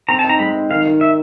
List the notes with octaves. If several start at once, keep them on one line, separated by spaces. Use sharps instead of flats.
C4 A#5
A5
D#4
A#5
G#3 B5
D#4
D#3 F5
D#3
E5